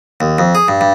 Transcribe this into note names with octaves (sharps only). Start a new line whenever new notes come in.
D#2
F2
G#4
G2
G2